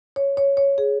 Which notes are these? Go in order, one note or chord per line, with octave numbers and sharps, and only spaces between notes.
C#5
C#5
C#5
G#4